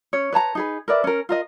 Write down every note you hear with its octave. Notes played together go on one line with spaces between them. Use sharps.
C#4 C#5
B4 C#5 A5 A#5
D#4 G#4 B4
A#4 B4 D5 E5
C#4 A#4
F4 A#4 D#5